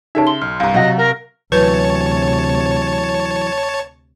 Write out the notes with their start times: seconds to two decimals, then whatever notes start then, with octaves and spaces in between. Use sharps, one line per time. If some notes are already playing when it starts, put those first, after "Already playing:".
0.15 C#3 D#4 G4 A4 C#5 E5 A5
0.27 C6 G7
0.42 B1 F6
0.60 C2 G2 F5 A#5
0.74 C3 F#3 F#4 D#5 F#6
0.97 A#4
1.52 D2 C3 E3 F#3 B3 B4 C#5 A5